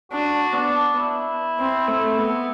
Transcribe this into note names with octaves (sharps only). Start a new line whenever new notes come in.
D4 F#4
B3 D4
E4
C4
A3
B3